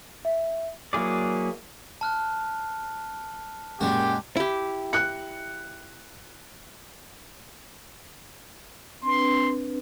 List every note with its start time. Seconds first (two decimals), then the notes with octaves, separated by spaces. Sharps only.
0.25 E5
0.93 F#3 A#3 E4 G#4 D5
2.01 A5 F6 F#6
3.81 F#2 A#2 F#3 G#3 F#4 G4
4.37 E4 G4
4.93 F#6 C#7
9.03 C4 D4 B4 C6